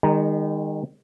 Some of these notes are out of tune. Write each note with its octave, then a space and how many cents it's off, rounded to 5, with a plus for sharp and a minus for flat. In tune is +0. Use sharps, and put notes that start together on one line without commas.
D#3 -10 G#3 -45 A#5 +0